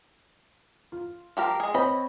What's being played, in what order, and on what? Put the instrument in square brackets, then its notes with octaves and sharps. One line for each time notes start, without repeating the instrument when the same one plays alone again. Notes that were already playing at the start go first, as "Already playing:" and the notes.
[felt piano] F4
[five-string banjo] F3 G4 A#4
G#3 G#4
[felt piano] C4 C#5 [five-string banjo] D#5 B5